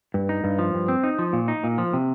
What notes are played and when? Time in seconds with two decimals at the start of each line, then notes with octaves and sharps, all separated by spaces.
0.14 G2
0.29 D#4
0.44 G2
0.59 F3
0.74 G2
0.88 C4
1.04 D#4
1.19 F3
1.33 A#2
1.48 D#4
1.64 A#2
1.78 F3
1.93 C3